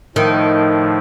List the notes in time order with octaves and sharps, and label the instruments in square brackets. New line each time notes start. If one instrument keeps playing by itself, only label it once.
[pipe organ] A2 F3 A3 [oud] D#3